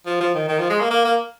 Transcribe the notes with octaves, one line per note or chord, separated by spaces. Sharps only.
F3
F3
D#3
D#3
F3
G#3
A#3
A#3
A#3